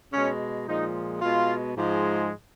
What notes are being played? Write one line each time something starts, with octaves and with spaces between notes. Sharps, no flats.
B2 G#3 C#4
A#2 F3 G#3 D#4
B2 G#3 F4
G#2 F3 G#3